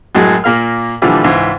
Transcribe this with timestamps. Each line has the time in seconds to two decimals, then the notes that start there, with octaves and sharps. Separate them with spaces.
0.15 F#2 A2 F#3 G#3
0.44 A#2 A#3 F5 F6
1.02 A#2 D3 E3 F3 G3
1.24 C#2 G#2 E3